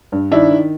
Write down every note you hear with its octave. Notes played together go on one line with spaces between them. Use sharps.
G2
D#3 D4 E4
D#3